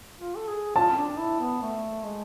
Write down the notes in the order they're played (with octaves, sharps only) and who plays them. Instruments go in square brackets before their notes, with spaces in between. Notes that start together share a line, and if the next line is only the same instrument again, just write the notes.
[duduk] F4
A4
G#4
[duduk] F4 [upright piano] A5
[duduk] C4
D4
E4
B3
A3
G#3